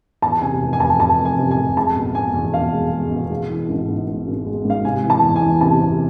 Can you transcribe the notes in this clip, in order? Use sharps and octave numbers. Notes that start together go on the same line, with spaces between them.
E2 A5
C3 G#5
F1
G#5
F1 A5
F1 A5
F1
G#5
C3
G#5
F1
G#3 A5
B2
B2 G#5
E2
B2 F5
G#3
G#3
B2
G#3
E3
G#1
G#2
G#2
G#1
G#3
G#2
F5
C3 G#5
E3
A5
E2
G#5
E3
C3 A5
C3